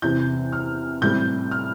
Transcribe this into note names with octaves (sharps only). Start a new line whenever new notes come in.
E2 C3 E3 G6
F6
A2 G3 C4 G6
F6